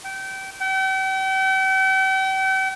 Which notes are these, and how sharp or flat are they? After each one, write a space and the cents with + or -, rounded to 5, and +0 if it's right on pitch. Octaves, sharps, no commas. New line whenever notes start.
G5 -30
G5 -40